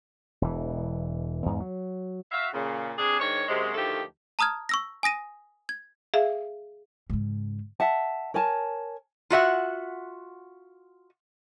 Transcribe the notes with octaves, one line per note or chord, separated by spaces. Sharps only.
E1 E3
E2 G#2
F#3
F#4 E5 F5
A#2 C#3
C3 D4 G#4
G#2 D#3 D4 C#5
F#2 C3 G#3
D2 D#3 F3 A3 G4 A4
A5 A#5 D#6 F6 G#6
C#6 E6 A#6
G#5 D#6 A#6 D#7
G#6
G#4 E5 F5
G#2 C#3
E5 F#5 A5
A#4 C#5 G#5 A5
F4 F#4 E5 F#5